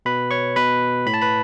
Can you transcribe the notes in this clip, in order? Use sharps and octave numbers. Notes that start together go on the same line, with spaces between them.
B2 B4 B5
C#5 C#6
B2 B4 B5
A2 B5
A5
B4 B5